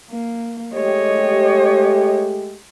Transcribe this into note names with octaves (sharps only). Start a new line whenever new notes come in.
A#3
G#3 A3 G4 C#5 D#5